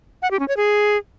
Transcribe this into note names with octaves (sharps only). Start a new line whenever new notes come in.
F#5
G4
C#4
C#5
G#4